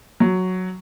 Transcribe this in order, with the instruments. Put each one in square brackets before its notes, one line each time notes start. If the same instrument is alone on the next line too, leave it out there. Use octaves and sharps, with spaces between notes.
[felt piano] F#3